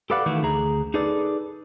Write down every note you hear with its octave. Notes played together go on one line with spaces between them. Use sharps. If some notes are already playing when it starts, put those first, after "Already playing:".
G4 A4 B4 D5 F5 F#5
D#3 E3 A3 E4 F#4
D2 G#4 A#5
D#4 G#4 A4 B4 D5